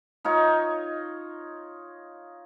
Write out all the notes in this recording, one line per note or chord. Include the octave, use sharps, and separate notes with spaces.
D#4 F4 C#5